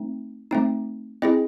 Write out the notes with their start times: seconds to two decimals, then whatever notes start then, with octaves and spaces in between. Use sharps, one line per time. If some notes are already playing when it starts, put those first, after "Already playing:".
Already playing: A3 C4 D#4
0.51 A3 C4 D#4
1.22 C4 E4 G#4 D#5